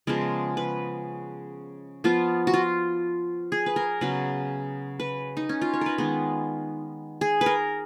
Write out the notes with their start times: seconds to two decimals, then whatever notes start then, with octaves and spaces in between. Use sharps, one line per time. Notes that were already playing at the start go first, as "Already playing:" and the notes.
0.07 C#3 F3 G#3 B3 A#4
0.57 B4
2.04 F3 B3 F4
2.47 F#4
2.54 F4
3.52 G#4
3.66 B4
3.76 A#4
4.01 C#3 F#3 B3 B4
5.00 B4
5.37 D#4
5.49 C#4
5.62 F4
5.73 C#5
5.81 A#4 B4
5.98 D#3 G#3 B3
7.21 G#4
7.41 B4
7.46 A#4